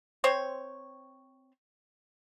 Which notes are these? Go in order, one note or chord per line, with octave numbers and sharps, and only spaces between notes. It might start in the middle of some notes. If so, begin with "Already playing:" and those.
C4 C5 C#5